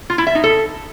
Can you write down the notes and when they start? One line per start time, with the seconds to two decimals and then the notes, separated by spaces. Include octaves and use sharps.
0.10 F4
0.18 E4
0.27 E5
0.35 D#4
0.44 A4